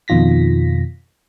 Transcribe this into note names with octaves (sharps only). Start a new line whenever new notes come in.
F2 B2 D#3 F4 A#6 B6